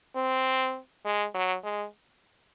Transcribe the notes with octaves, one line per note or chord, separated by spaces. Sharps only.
C4
G#3
F#3
G#3